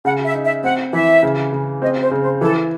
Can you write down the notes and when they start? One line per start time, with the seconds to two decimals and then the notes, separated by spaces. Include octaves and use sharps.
0.05 C#3 F#5
0.25 E5
0.34 D#4
0.44 E5
0.63 C4 F#5
0.93 E3 E5
1.23 C#3
1.53 C#3
1.82 C4 D#5
2.01 C5
2.11 C#3
2.21 C5
2.41 E3 A4